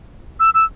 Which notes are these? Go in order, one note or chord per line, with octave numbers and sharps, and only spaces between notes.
E6
E6